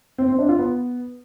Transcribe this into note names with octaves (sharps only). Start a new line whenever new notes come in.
C4
C4
D4
F4
B3